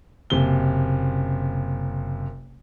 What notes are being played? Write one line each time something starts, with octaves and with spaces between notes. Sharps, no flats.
F#1 C3 G7